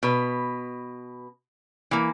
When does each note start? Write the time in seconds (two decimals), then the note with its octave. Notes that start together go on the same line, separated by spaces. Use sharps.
0.03 B2 B4
1.91 E3 A#3